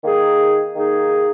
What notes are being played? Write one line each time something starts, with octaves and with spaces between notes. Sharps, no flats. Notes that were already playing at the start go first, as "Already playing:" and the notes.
D#3 A#3 D#4 G#4
D#3 A#3 D#4 G#4